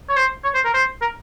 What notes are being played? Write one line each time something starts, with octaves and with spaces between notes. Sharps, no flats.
C#5
C5
C#5
C5
A#4
C5
A#4